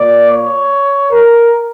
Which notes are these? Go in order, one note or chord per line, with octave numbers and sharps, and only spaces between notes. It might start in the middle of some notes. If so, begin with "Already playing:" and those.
Already playing: A#2 A#3 D5
C#5
A#4